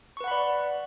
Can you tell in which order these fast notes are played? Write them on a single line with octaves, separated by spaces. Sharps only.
C#6 B4 F#5 B5 D5